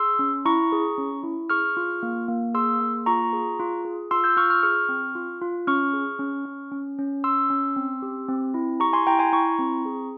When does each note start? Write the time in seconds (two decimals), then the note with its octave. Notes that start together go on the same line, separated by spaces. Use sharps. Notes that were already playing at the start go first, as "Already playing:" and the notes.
Already playing: G#4 C6 E6
0.19 C#4
0.45 E4 A#5 C#6
0.72 G#4
0.98 C#4
1.23 E4
1.50 G#4 C#6 F6
1.77 F4
2.03 A#3
2.28 A#3
2.54 G#4 C6 E6
2.80 A#3
3.06 F4 A#5 C#6
3.33 G#4
3.59 F4
3.85 G#4
4.11 F4 C6 E6
4.24 E6 G6
4.37 F4 C#6 F6
4.50 C#6 F6
4.63 G#4 C#6 F6
4.89 C4
5.15 F4
5.41 F4
5.67 C#4 C#6 F6
5.93 G#4
6.19 C#4
6.45 C#4
6.72 C#4
6.99 C#4
7.24 C#4 C6 E6
7.50 C#4
7.76 C4
8.02 G4
8.29 C4
8.54 E4
8.80 G4 A#5 C#6
8.93 G#5 C6
9.07 E4 G5 A#5
9.19 G#5 C6
9.33 E4 A#5 C#6
9.59 C4
9.86 G#4